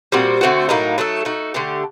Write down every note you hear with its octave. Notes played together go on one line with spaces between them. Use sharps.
A#2 G3 C4 F#4
D3 A3 C4 F#4
A2 F#3 A#3 D#4
F#3 A3 D#4 A4
A3 D#4 F#4
D3 A3 D4 G4